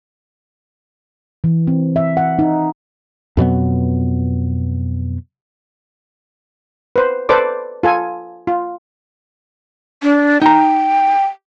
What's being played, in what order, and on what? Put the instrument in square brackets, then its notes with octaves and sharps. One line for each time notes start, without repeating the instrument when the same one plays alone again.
[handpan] E3
C4
E5
F#5
D#4
[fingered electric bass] F2 B2 F#3 B3
[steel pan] B4 C5
A4 B4 C5 D5 D6
F4 A4 G#5
F4
[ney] D4
[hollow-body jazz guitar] D#4 A#5 [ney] G5